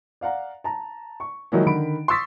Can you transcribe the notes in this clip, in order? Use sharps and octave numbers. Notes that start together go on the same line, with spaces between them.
D5 F5 F#5 A#5
A5 A#5
C#6
D#3 F3 F#3 G#3 A#3 E4
D3 D#3 B5 D7
C6 C#6 D#6 E6 A6 B6